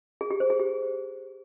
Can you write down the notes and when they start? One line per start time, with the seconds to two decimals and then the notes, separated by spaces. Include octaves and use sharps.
0.21 G#4
0.31 G4
0.40 C5
0.50 G#4
0.60 G4